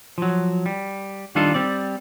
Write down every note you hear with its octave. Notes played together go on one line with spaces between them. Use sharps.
F3 F#3
G3
D#3 G3 D4 D#4 F4 A4
G3 C4 D5